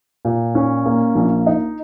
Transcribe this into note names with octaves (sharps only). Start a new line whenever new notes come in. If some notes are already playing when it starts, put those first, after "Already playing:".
A#2
C#4
A#3
A#1
D#4